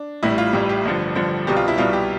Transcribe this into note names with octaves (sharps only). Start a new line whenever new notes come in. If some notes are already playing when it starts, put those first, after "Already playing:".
Already playing: D4
A1 A2 G3 E4
F4
A1 A2 G3 G4
G4
A1 G2 D3 F3
A1 G2 D3 F3
C2 B2 G3 G4
F4
E4
C2 B2 G3 F4
G4